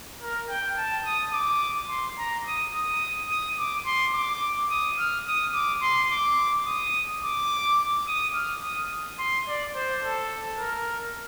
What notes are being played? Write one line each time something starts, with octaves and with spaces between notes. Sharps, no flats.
A#4
G5
A5
D#6
D6
C6
A#5
D#6
D#6
D#6
D6
C6
D6
D#6
F6
D#6
D6
C6
D6
D#6
D6
D#6
F6
D#6
C6
D5
C5
A4
A#4